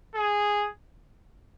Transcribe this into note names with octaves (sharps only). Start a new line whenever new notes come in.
G#4